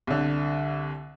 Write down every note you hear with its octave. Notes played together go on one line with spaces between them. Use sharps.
C2 D3